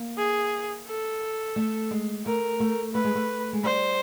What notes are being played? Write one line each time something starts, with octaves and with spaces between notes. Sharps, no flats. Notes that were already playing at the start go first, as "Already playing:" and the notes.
Already playing: A#3
G#4
A4
A3
G#3
A3 A#4
A3
A3 B4
G#3
A3
G#3
G3 C5